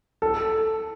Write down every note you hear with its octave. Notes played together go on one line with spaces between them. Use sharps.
A4